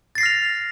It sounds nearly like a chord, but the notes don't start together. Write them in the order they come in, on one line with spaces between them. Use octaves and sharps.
A6 C7 A#6 F6 F7